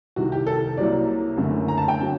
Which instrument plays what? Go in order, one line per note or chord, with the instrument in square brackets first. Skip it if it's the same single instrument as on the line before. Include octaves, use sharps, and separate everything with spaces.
[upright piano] C2 C3 D#3 F#4
G4
A4
C2 C3 F#3 A#3 D5
F#1 F#2 D3 A3
A#5
A5
G5
D3 F#3